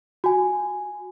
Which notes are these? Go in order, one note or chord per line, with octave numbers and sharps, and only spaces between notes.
F#4 G#5